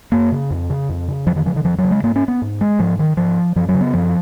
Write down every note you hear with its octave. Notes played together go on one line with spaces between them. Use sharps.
F#2 A#3
C#3
F2
C#3
F2
C#3
F2 F3
D#3
C#3 F3
D#3
F2 F3
F#3
C#3
G#3
G#2 A#3
C#4
B3
G#2
G#3
G#2 F3
D#3
G#2 F3
F#2 F3
F#3
C#3
B3
F#2 F3